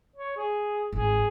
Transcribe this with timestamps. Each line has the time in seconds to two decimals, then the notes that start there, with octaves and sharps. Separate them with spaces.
0.16 C#5
0.37 G#4
0.92 G#1 G#4